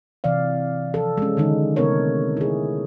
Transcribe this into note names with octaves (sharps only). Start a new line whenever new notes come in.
C3 E3 D5 F5
F3 A4
G#3 C#4
D3 D#3 G#3 D#4
C3 A3 B3 D#4 A#4 C#5
E4 G#4